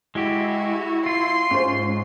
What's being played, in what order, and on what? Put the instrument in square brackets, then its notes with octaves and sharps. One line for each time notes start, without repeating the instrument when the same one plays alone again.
[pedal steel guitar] G#3 G4 [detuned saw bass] E4 [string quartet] F#4
[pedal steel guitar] F4 [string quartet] C6
[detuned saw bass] G#2 [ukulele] C#4 C5